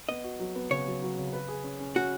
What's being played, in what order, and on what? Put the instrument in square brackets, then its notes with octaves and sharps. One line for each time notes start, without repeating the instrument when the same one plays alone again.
[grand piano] B3 [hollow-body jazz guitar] D#5
[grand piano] F#4
F#3
B3
[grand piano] C#3 [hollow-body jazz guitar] C#5
[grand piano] F#3
F#3
C#3
B4
G#4
C#4
C#4
[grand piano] C#4 [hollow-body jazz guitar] F#4